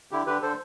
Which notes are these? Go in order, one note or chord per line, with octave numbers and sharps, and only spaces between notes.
D3 E4 G4
D3 G4 B4
D3 A4 C5